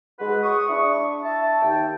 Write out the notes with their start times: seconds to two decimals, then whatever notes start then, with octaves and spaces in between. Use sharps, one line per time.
0.19 G#3 F#4 B4
0.43 C#6 D#6
0.68 D4 E4 C#6
1.24 E5 A5
1.62 D#2 G5